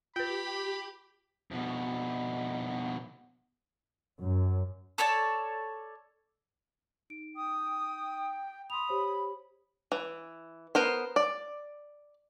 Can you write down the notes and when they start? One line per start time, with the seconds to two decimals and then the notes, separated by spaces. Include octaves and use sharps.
0.16 F4 G4 B4 G5 B5
1.51 F2 B2
4.20 F#2
4.98 A4 C#5 D5 A5
7.10 D#4 D7
7.36 G5 D#6
8.70 B5 C6 D#6 F7
8.89 G4 C5 C#5
9.92 E3
10.75 B3 A#4 C5
11.16 D5